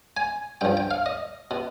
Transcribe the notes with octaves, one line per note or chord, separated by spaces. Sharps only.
G#5
G2 F3 G5
G5
F5
D#5
B2